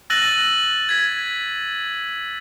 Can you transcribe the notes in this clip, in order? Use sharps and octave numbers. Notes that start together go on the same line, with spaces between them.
E6 F#6 A6 A#6 D#7 F#7
G#6 B6